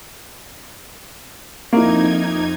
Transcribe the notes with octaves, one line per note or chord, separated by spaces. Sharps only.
F2 A#3 D#4 E4 G#6